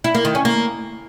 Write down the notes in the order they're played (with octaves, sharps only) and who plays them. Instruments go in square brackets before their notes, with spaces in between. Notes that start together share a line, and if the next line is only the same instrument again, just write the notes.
[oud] E4
A#3
D#3
C#4
A#3